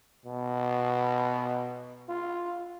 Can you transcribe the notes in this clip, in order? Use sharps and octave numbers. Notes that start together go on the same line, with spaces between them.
B2
F4